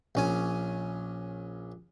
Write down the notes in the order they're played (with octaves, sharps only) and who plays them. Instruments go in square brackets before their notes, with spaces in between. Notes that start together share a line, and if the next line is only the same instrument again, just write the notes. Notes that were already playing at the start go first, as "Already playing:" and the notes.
[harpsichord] A#1 C#4 G#5